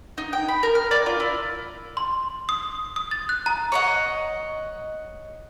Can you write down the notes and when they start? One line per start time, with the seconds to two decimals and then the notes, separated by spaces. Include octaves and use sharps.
0.18 D#4
0.33 G5
0.48 B5
0.63 A#4
0.75 F6
0.91 D5
1.06 F4
1.20 E4
1.97 C6
2.49 D#6
2.96 D#6
3.11 A6
3.29 F#6
3.46 A#5
3.72 C#5 D#5 F#5